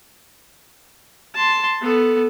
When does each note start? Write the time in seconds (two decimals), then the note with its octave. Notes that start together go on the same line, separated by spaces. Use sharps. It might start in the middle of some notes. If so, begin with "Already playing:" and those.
1.35 A5 C6
1.81 B3 A4